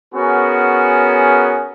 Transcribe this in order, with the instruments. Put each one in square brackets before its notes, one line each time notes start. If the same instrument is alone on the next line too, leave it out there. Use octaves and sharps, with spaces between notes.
[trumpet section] B3 C#4 F#4 G#4 A#4